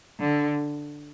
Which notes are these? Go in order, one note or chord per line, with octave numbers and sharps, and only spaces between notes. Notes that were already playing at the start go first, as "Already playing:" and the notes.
D3